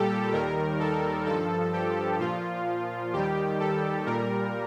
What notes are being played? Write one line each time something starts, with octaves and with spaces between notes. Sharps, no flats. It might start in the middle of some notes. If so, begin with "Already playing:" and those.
Already playing: A#2 G3 G4 A4
D#2 D#3 G3 A#4
A4
G2 F3 A4
G4
A#2 F3 F4
D#2 D#3 G3 G4
A4
A#2 G3 A#4